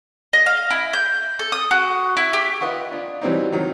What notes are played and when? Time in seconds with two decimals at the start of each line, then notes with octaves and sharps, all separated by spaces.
0.33 D#5
0.46 F5
0.70 E4
0.93 G6
1.39 A4
1.52 D#6
1.71 F#4
2.17 E4
2.33 G4
2.60 F4 B4 D#5 F#5 C#6
2.91 D4 F4
3.22 E3 F#3 G3 C4 D4 D#4
3.52 D#3 F#3